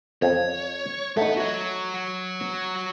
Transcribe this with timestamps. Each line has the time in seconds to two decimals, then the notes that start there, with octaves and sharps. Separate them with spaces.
0.22 F2 C#5
1.17 A3 B3 D#4 F#5
1.37 F#4 C#5